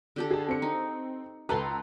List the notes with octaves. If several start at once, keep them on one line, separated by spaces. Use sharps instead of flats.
D3 G4 A4
G#4 A5
C4 C#7
D#4
C#2 A4 B4 A5 A#5 C6